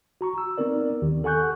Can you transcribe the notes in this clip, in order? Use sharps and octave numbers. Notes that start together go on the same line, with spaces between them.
F#4 A#5 C#6
E6
B3 C4 D#4 A#4 D5
D#2 D#3 G4
A4 F#5 G#5 C#6 F#6 G6